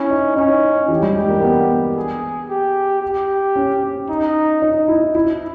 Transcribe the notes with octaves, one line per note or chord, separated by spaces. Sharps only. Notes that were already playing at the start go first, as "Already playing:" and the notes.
Already playing: C#4 E4
D#4
C#4 D#4
E3 G4
G3
G#3
A#3
B3
G#4
G4
G4
C#4
D#4
D#4
E4
E4